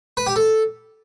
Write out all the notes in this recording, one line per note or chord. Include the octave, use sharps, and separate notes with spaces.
B4
G4
A4